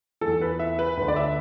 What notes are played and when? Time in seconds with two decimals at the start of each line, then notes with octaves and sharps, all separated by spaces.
0.21 E2 E3 A4
0.41 B4
0.59 E5
0.79 B4
0.97 D2 D3 B4
1.08 D5
1.16 E5